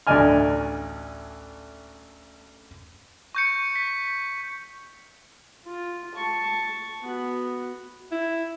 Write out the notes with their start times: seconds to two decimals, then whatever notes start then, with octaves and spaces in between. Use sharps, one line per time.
0.07 A1 D2 D5 D#5 G#5 F6
3.35 C#6 G6 C#7
3.76 B6
5.65 F4
6.15 A5 C#6
7.02 B3 F#4
8.12 E4